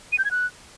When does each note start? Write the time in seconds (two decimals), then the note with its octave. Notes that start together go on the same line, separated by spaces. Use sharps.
0.12 D#7
0.19 G6
0.25 G#6
0.31 F#6